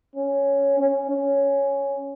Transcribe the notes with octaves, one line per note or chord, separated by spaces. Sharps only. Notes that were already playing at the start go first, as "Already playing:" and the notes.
C#4
C#4
C#4